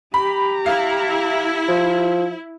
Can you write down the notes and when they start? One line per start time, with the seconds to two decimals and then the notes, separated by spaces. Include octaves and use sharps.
0.14 G4 A#5 B5
0.66 E4 F5
1.68 F3